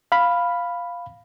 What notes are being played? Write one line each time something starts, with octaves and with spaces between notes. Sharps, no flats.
F5 B5